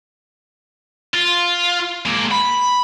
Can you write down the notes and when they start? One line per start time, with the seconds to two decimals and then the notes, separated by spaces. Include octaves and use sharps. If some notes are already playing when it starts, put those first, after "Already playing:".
1.14 F4
2.06 G#3 A#3
2.31 B5